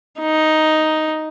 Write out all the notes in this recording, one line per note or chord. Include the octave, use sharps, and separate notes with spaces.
D#4